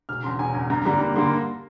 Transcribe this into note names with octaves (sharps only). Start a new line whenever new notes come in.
E1 F6
E2 C#3 C6
E1 G#5
E2 C#3 G#5
G2 A#5
D3 G3 A#3 A#5
G2 B5
D3 G3 A#3 C6